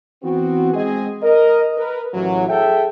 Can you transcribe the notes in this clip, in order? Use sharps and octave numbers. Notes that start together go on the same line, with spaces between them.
E3 B3 C4 F#4
G#3 C4 G#4 D#5
A#4 D#5
A#4 B4
A1 E3 F#3
G#4 A4 E5 G5